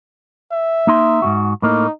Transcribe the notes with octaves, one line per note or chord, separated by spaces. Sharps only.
E5
A#3 D#4 C6
G#2 B2 F#4
A2 A#3 D#4